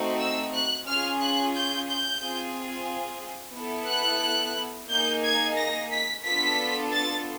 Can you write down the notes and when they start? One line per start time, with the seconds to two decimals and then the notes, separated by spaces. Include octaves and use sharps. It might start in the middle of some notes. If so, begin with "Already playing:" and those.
Already playing: A3 C4 D#4 F#4
0.19 E6
0.53 F#6
0.87 C#4 F4 G#4 F6
1.20 F#6
1.55 G6
1.88 G6
2.21 C4 F4 G#4
3.56 B3 E4 A4
3.89 F#6
4.90 A#3 D#4 G#4 G6
5.24 G#6
5.57 A#6
5.92 B6
6.25 B3 D4 F4 A4 B6
6.92 A6